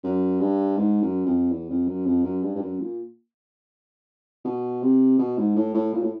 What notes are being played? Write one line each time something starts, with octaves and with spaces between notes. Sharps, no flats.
F#2
G2
G#2
F#2
F2
E2
F2
F#2
F2
F#2
G2
G2
F#2
A#2
B2
C3
B2
G#2
A2
A2
A#2
A2